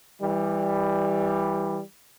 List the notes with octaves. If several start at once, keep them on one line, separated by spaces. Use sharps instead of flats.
E3 G3